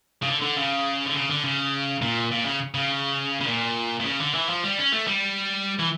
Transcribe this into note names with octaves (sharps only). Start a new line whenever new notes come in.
C#3
D3
D3
C#3
D3
C#3
D3
C#3
A#2
A#2
C#3
C#3
C#3
A#2
A#2
C#3
D3
E3
F3
G3
C#4
A3
G3
E3